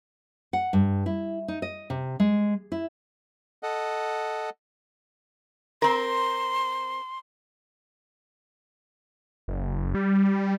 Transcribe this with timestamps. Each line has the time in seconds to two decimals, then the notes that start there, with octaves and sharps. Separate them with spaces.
0.53 F#5
0.73 G2
1.06 E4
1.48 D#4
1.62 D#5
1.90 C3
2.20 G#3
2.72 E4
3.63 A4 D#5 F#5
5.82 C4 A#4 C6
9.48 F#1
9.95 G3